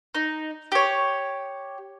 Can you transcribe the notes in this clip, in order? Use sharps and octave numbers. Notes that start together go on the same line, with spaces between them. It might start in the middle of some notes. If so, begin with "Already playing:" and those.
D#4
G4 C#5